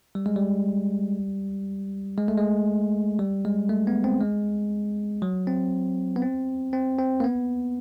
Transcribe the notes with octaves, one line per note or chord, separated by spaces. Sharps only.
G3
G#3
G3
G#3
A3
G#3
G3
G#3
A3
B3
C4
G#3
F#3
C4
B3
C4
C4
C4
A#3
B3